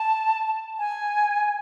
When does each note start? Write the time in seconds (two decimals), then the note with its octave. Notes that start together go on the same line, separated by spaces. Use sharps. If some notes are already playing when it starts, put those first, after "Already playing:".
Already playing: A5
0.79 G#5